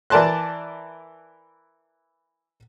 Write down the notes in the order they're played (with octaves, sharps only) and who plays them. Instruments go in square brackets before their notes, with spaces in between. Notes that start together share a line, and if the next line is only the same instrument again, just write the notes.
[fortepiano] E3 A#4 D5 A5 C6 F#6